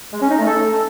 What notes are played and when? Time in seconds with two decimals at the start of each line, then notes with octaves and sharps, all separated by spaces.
0.13 G#3
0.21 C#4
0.30 D#4
0.38 A3
0.46 A4